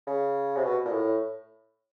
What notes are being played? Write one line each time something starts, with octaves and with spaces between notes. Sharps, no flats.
C#3
C3
B2
A#2
A2